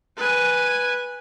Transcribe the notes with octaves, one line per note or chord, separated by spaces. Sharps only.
B4 G#5